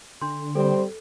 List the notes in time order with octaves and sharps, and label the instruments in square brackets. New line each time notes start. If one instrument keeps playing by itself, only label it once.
[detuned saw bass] D3 [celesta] D4 C6
[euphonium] G3 [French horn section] C4 [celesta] A4